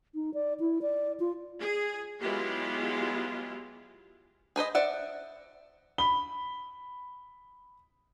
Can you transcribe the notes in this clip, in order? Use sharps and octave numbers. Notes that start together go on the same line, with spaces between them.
D#4
D5
E4
D5
F4
G#4
F#3 G#3 B3 E4 F4 G4
G#4 B4 C5 D#5
C5 D5 E5 F#5
B5 G7